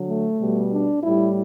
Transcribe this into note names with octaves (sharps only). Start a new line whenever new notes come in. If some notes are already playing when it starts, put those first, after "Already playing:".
Already playing: D3 F#3
A3
B2 G3
D4
A2 G3 E4